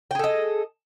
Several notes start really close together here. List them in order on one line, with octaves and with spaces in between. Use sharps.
G5 G#4 A4 D#5